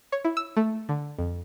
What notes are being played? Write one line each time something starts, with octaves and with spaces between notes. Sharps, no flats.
C#5
E4
E6
A3
D3
F2